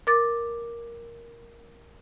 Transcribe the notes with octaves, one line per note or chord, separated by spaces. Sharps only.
A#4 D6 A6